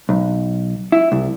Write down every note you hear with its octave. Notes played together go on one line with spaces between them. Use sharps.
B1
E4
C2